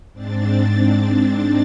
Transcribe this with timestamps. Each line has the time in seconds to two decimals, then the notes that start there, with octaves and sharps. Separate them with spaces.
0.13 G#2 C4 D4 A6